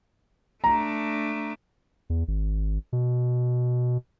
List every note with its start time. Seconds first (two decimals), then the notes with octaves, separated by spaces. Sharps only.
0.64 A3 D4 A#5
2.10 E2
2.28 G#1
2.93 B2